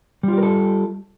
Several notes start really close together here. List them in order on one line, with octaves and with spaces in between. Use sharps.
G3 F4 G4 A#4 A4